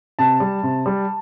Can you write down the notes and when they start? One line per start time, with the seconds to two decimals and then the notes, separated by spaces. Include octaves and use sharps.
0.19 C3 A5
0.40 G3
0.63 C3
0.86 G3